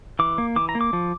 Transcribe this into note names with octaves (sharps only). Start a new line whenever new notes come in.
E3 D6
A#3
E3 D6
A#5
A#3
D6
F3